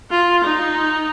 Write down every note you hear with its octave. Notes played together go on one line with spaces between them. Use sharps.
F4
D#4